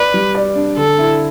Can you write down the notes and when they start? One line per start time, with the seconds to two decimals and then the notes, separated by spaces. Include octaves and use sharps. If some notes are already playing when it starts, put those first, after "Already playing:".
Already playing: B4 D5
0.14 G3
0.35 D5
0.55 D4
0.77 D3 A4
0.98 E4